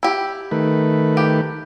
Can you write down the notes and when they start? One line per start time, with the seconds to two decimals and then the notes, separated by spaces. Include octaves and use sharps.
0.03 E4 G4
0.51 D#3 A3 B4
1.17 G4